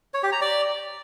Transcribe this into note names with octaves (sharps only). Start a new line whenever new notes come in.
C#5
G4
A#5
D5